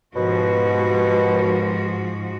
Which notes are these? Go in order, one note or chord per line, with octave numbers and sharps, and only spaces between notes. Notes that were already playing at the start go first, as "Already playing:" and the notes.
D#2 G#2 B2 F3 F#4